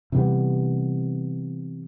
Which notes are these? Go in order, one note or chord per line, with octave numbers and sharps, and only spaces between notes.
C3 E3 G3 B3